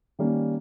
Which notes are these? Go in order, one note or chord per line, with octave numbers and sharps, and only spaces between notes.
D#3 G3 A#3 C#4